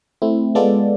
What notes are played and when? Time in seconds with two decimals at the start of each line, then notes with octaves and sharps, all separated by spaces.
0.22 A3 C4 E4
0.55 G#3 B3 F4 A4 D5